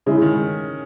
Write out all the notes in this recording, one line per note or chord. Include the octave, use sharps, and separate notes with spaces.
C#3 G#3 C#4 E4
D#3